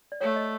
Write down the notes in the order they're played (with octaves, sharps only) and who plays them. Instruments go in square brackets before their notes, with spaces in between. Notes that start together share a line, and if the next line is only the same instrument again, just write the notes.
[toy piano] D5
[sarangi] A3 [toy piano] C#5
[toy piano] D#5